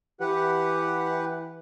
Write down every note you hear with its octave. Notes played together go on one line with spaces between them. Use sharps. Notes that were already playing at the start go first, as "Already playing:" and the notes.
E3 G4 B4 F#5